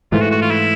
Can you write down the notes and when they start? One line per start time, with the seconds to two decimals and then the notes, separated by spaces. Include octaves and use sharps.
0.12 G#2 E3 A3 F4
0.21 F#4
0.31 F#4
0.42 F4
0.51 E4